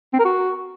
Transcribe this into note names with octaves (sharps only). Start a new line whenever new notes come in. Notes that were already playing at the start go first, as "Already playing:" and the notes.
C4
A#4
F#4